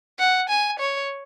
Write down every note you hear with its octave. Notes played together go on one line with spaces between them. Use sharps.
F#5
G#5
C#5